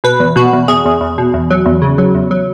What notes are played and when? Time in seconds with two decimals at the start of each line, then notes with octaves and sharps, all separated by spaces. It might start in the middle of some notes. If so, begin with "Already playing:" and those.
0.04 B2 B4
0.20 E2
0.36 B2 F#4
0.53 E2
0.68 E2 G#4
0.85 E2
1.01 E2
1.18 B2
1.34 E2
1.50 F#3
1.66 E2
1.82 C#3
1.98 F#3
2.15 E2
2.31 F#3